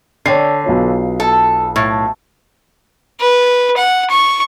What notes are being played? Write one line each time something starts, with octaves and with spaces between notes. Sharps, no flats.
D3 C#5 G5 C7
B1 F4 C#5
A4
A2
B4
F#5
C#6